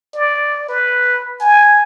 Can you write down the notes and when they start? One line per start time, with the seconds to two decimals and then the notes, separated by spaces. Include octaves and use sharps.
0.15 D5
0.69 B4
1.40 G#5